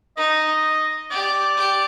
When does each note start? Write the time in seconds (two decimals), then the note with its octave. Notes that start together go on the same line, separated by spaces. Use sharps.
0.17 D#4 D#5
1.11 G4 D5
1.57 G4